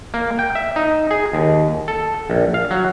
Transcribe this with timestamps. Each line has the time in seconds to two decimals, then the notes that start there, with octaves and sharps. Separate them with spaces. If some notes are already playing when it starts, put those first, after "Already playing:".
0.14 A#3
0.39 G5
0.55 E5
0.76 D#4
1.11 G#4
1.33 D#2
1.88 A4
2.30 A#1
2.54 F5
2.71 F#3